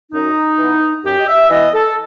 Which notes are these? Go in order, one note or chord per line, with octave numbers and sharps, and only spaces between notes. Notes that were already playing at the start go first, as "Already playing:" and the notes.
F#2 D#4
E3 B3
F#2 G4
D#5
E5
E3 B3 D#5
A4